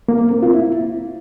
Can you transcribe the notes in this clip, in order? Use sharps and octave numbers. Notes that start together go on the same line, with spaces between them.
A#3
A#3
C4
F4
E4